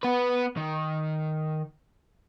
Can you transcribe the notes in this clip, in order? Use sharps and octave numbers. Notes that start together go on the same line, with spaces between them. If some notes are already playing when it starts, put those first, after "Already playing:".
B3 B4
D#3